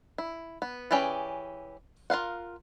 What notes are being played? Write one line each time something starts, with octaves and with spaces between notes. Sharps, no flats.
E4
B3
E3 C#4 G4 G#4 D5
F4 A#4 F5 F#5